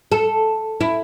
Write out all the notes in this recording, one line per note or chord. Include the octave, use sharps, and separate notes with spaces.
A4
E4